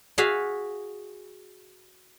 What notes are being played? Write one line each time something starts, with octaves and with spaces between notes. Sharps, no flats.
F#4 G#4 E5 F5